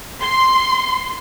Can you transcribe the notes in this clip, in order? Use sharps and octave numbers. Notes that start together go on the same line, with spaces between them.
C6